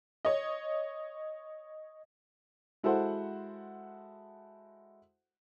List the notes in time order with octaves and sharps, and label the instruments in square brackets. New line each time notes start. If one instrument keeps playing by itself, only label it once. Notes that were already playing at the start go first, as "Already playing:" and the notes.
[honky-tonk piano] C#5 D#5
[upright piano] G#3 E4 F#4 A4 C5 F#5